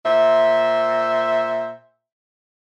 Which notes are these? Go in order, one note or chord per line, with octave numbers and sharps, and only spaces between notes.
A#2 C5 E5